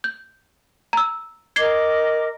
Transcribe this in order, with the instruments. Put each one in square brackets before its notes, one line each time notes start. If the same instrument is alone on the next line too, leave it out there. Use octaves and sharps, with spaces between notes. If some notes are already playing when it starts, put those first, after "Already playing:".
[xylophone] G6
A#5 E6
[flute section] A#4 D#5 D6 [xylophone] G#6 C7 G7